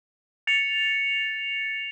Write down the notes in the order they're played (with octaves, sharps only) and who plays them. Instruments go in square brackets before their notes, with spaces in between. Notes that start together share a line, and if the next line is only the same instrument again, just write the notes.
[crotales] A6 C#7 F7